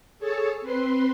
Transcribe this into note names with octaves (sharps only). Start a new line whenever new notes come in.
G#4 A4 C#5 A5
C4 B4 C6